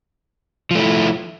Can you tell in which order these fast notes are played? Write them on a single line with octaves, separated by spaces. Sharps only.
F3 A3 E4